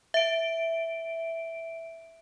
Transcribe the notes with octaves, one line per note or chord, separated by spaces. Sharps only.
E5 D7